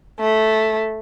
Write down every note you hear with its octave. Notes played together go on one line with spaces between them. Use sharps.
A3